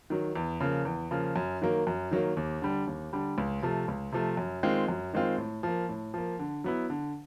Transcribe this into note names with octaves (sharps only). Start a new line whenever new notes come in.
D#3 F#3
E2
C#3 F3 A#3
E2
C#3 F3 A#3
F#2
D#3 F#3 A#3
F#2
D#3 F#3 A#3
D#2
D3 G3
D#2
D3 G3
C#2
C3 F3 A3
C#2
C3 F3 A3
F#2
D#3 G#3 C4 F4
F#2
D#3 G#3 C4 F4
A2
F3 A#3
A2
F3 A#3
D3
F#3 B3 E4
D3